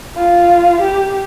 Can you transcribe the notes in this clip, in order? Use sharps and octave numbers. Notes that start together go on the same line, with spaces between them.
F4
G4